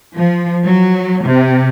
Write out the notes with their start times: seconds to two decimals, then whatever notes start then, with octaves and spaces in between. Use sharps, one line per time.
0.15 F3
0.64 F#3
1.25 C3